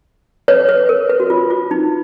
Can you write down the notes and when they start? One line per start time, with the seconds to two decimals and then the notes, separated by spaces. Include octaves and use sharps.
0.48 B4 C#5
0.69 B4
0.89 A#4
1.10 B4
1.20 F#4
1.30 F4
1.50 F4
1.71 D#4